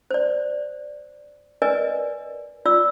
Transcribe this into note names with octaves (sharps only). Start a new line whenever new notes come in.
C5 D5
A#4 B4 D5 D#5 G#5
F4 D5 E6